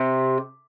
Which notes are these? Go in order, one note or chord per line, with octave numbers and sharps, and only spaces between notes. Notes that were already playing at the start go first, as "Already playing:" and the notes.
Already playing: C3